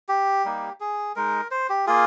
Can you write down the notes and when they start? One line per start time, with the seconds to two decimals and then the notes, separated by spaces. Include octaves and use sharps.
0.09 G4
0.45 G3 A#3 D#4
0.80 G#4
1.16 G#3 D#4 A#4
1.51 C5
1.69 G4
1.87 A#3 F4 G#4